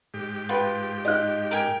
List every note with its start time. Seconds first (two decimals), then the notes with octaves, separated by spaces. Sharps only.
0.14 G#2 G4
0.49 F4 B4 G5
1.05 D#4 F#6
1.51 A#4 G5 G#5